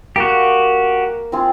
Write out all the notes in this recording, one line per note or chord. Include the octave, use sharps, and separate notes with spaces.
A#3 F#4 G4
C4 F4 G#4